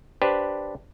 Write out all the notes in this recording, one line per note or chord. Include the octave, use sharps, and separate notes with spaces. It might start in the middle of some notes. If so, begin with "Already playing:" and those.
D4 G4 B4 C5